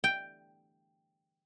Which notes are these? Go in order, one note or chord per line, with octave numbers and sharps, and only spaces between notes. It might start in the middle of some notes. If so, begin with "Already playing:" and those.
G5